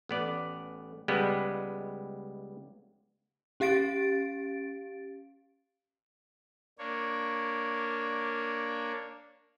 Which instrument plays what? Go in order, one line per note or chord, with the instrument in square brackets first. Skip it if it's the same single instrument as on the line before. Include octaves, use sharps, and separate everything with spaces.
[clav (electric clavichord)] A1 B3 D5
C#2 G3 G#3 B3
[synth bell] C#4 G4 F5 A6 D7
[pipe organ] A#3 D4 C#5